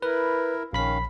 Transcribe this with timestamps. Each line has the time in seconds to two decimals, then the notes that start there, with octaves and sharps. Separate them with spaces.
0.02 E4 A#4 B4
0.73 A#1 D#3 C#4 F5 B5 B6